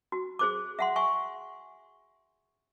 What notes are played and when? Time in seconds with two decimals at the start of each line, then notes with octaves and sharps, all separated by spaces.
0.12 F#4
0.39 G#4 C5 D6
0.79 E5 F#5 C6
0.96 E5 G#5 C#6